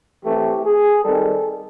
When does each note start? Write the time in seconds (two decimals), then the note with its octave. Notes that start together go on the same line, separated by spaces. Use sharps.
0.24 E3 A3 C4 G4
0.65 G#4
1.05 D#3 G3 C4 A4